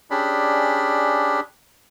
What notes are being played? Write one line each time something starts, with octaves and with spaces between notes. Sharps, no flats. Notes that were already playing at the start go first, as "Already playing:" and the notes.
C#4 D4 G4 G#4 D5 B5